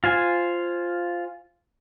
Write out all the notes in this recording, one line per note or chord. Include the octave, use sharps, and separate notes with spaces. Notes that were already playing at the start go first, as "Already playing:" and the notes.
F4 C5 G#5